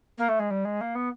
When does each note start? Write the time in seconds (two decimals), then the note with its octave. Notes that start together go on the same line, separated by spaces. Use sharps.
0.18 A#3
0.28 A3
0.39 G#3
0.50 G3
0.65 G#3
0.81 A#3
0.95 B3